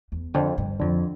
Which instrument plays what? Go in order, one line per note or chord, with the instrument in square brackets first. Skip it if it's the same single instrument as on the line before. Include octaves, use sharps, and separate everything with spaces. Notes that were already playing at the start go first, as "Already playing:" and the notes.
[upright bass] E2
[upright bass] F2 [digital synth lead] D3
[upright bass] G2
[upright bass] F2 [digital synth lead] D3